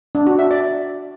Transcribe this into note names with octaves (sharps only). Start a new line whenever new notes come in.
D4
F#4
E5
D5